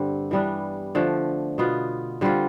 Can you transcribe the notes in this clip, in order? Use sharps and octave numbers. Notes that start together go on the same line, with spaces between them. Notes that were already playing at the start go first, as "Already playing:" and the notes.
Already playing: G2 D3 G3 C4
E3 G3 B3 D4
D3 F3 A3
B2 B3 F4
D3 G3 C4 F4